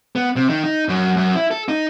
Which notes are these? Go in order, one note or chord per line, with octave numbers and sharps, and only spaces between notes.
B3
C3
D#3
D#4
F#2
F#2
E4
A4
D#4